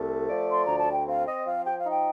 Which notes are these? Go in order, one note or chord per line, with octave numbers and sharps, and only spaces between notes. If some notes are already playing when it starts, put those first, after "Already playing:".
Already playing: C2 A3
F3 D5
C6
D2 A#5
A5
G5
C4 F5
D#5
F3 F5
G5
F5
D#4
G5